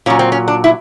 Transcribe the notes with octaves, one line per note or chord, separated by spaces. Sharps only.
A#2 F#3 C#4
C4
C#4
D4
E4